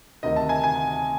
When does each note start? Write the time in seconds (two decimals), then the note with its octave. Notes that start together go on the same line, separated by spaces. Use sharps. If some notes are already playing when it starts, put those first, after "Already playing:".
0.23 D2 C3 D#3 D#5
0.36 A5
0.49 G#5
0.64 G#5